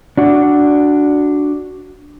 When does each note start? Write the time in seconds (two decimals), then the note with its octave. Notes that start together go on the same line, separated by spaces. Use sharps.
0.17 D4 F#4